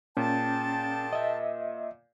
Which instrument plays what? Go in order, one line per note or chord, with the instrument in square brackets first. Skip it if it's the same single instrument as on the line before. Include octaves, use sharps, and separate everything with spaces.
[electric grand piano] A#2 [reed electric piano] C#4 [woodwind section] G#4 G5 A5
[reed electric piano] D#5 E5